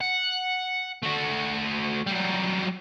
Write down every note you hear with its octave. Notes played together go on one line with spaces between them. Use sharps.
F#5
A3 F#4
F#3 G3